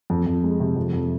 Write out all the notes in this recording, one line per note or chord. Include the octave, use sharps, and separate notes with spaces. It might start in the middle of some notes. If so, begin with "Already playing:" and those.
F2
F2
G#3
C3
F2
F2